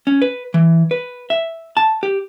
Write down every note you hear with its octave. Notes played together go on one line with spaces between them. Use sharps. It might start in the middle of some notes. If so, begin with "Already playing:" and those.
C#4
B4
E3
B4
E5
A5
G4